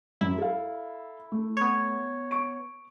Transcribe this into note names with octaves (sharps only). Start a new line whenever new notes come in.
F#2 E4
A4 F5
A3
B3 C#5
C#6 D7